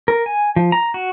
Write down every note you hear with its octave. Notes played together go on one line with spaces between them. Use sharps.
A#4
G#5
F3
A#5
F#4